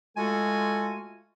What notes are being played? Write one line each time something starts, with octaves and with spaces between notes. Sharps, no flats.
G#3 A3 F4 F#4 A4 G#5